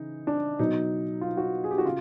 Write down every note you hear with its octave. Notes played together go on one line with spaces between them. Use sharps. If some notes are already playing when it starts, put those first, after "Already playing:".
Already playing: C#3 E3 D#4
D4
B2 F#3 D#4
F4
F#4
G#4
G4
F#4
C#3 F4